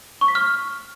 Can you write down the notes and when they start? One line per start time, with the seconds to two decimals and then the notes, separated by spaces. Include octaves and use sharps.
0.21 C#6
0.28 B6
0.35 F6